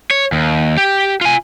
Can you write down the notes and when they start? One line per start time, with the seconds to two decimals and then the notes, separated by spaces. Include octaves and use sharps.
0.11 C#5
0.32 D#2
0.77 G4
1.21 F4 G#5